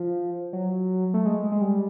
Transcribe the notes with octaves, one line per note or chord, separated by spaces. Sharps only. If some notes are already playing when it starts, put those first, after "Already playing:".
Already playing: F3
F#3
A3
G#3
G#3
G3